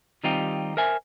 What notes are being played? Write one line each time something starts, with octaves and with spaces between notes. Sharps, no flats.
D#3 G3 C4 D#4 F4 G4
A#4 C5 E5 G#5